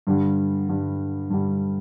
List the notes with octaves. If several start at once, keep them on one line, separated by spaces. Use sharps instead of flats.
G2 D3 G3
G2 D3 G3
G2 D3 G3